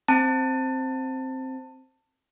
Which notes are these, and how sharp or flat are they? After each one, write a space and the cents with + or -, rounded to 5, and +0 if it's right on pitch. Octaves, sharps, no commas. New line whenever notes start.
C4 +0 A5 +25